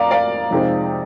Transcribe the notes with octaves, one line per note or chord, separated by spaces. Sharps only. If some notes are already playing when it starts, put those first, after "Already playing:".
Already playing: F2 D5 F5 A#5 D6
D5 F5
F2 C3 F3 G#3 D#4